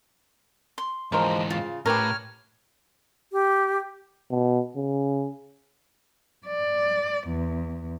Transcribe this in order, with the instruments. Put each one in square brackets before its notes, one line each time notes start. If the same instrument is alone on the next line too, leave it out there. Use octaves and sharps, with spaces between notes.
[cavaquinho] C6
[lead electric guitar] G#2 E3 [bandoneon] F3 G#3 [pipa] C#4 A#4 C5
[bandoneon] C#3 [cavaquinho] F4
[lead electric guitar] A2 [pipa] C#4 G4 [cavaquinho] A#4 B4 [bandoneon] C#5 F6
[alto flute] G4
[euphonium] B2
C#3
[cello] D5
E2